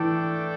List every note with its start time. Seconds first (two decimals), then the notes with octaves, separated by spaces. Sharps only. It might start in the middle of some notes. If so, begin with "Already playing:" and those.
Already playing: E3 A3 D4 A4 D5 G5